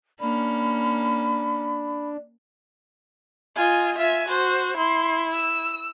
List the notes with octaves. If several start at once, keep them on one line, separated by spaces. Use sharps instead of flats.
A#3 C#4 D4 B5
F4 D#5 G#5
F4 E5 G#5
F#4 C5
E4 C6
E6